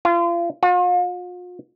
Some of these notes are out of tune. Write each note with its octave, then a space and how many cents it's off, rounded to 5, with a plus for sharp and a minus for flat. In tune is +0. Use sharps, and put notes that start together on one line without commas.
F4 -30
F4 +45